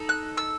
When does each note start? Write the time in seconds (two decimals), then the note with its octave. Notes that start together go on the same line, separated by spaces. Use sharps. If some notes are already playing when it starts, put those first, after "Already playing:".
Already playing: D#4 A4
0.09 F#6
0.37 E6